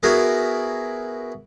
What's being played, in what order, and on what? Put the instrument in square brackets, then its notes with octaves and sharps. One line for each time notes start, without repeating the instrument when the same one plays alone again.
[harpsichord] B3 E4 F#4 G#4 A#4